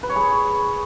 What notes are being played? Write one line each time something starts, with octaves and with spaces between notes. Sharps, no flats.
B4
C#5
G#4